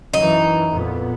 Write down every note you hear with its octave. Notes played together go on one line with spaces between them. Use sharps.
F#2 E3 D#4
F2 A#2 B3